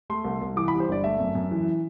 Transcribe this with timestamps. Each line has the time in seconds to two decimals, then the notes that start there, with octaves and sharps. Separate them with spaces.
0.10 A3 C6
0.25 C2
0.41 C2
0.56 E3 D6
0.68 B5
0.72 G3
0.80 C5
0.89 G1 D5
1.04 A3 E5
1.19 F#2
1.35 F#2
1.51 E3